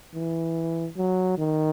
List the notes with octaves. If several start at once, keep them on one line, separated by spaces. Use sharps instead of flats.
E3
F#3
D#3